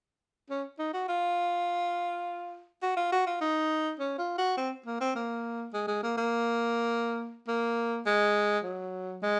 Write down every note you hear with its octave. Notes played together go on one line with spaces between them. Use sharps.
C#4
D#4
F#4
F4
F#4
F4
F#4
F4
D#4
C#4
F4
F#4
C4
A#3
C4
A#3
G#3
G#3
A#3
A#3
A#3
G#3
F#3
G#3